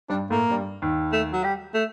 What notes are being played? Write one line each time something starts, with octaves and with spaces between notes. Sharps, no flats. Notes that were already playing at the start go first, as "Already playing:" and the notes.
G2 G3 D4
A2 A3 A#3
G2 G3
D#2 D#3
A3
F#3
G3
A3